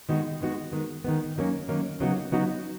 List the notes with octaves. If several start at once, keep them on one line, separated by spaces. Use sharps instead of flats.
D#3 G#3 B3 D#4 F#4
D#3 G#3 B3 D#4 F#4
D#3 G#3 B3
D#3 G#3 B3
D#3 F#3 A#3 C#4
D#3 F#3 A#3 C#4
C#3 F#3 B3 D#4 F#4
C#3 F#3 B3 D#4 F#4